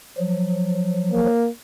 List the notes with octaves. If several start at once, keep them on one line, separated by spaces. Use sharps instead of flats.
F3 F#3
A#3